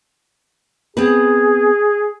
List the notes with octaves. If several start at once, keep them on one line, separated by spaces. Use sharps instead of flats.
B3 C4 G#4 B4